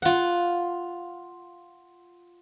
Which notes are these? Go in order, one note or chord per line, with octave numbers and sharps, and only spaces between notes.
F4 F#5